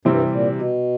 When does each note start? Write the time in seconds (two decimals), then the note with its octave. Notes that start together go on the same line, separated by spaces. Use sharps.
0.05 G2 C3 E3 G3 C4 E4
0.31 A#2
0.56 B2